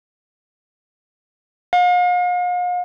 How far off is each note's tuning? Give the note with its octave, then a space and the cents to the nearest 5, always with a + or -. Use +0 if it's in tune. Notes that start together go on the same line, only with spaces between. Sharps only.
F5 +45